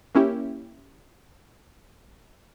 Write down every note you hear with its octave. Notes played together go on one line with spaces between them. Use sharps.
A#3 C#4 E4 G4